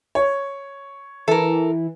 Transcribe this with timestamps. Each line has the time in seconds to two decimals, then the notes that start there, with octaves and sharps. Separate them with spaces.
0.15 C#5
1.28 E3 A4 A#4